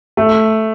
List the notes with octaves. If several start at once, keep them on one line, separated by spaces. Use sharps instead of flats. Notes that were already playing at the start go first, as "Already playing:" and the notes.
A3